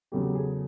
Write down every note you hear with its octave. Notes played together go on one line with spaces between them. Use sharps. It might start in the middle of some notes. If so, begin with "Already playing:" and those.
E2 C#3 F#3 A3 G4
G#4